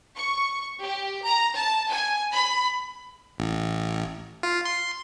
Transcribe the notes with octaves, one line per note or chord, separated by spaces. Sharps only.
C#6
G4
A#5
A5
G#5
B5
A1
F4
C6